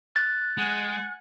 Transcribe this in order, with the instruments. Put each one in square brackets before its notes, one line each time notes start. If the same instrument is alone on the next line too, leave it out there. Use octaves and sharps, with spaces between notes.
[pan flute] F#6 [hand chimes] A6
[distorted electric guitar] G#3 [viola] F#5 G#5